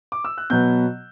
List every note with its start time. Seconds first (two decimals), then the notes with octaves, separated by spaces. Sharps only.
0.12 D6
0.25 E6
0.38 F#6
0.50 B2 F#3 B3 G6